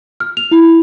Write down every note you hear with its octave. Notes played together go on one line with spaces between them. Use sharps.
F6
F7
E4